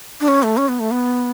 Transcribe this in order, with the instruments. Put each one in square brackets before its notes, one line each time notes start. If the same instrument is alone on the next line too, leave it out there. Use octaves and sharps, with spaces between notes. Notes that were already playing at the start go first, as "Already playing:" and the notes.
[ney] D4
C#4
A3
C#4
B3
A3
B3